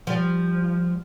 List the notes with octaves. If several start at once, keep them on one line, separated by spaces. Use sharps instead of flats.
F3 G3